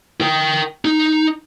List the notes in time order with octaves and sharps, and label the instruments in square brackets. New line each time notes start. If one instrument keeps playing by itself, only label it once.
[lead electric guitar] A#4 G5
D#4